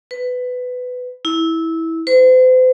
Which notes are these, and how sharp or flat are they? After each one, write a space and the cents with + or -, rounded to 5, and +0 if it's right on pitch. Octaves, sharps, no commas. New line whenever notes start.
B4 +15
E4 -15
C5 -40